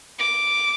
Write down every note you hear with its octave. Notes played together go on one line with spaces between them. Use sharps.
D6